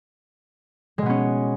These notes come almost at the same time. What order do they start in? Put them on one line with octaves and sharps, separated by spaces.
G#3 B2 B3 C#4